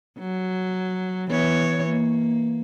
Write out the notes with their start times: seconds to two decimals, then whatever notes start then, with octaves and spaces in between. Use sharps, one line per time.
0.19 F#3
1.31 E3 B3 C#5
1.88 A#3